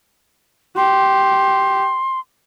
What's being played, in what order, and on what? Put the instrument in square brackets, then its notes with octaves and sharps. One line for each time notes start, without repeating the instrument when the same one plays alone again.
[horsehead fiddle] G4 [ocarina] C6